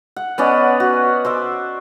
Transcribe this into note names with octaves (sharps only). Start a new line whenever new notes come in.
F#5
B3 C#4 D5 D#5
F#4
C5 D5 E5